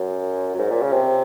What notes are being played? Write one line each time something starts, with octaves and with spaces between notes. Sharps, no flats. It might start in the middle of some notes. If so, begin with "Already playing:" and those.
Already playing: F#2
F#2
G#2
A#2
C#3
C3